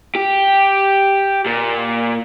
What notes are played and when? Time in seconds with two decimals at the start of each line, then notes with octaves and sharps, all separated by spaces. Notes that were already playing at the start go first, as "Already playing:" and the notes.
0.16 G4
1.46 A#2